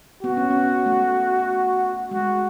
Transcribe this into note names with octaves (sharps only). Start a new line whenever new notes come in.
B3 F#4
C#4
B3
A3
G#3 F#4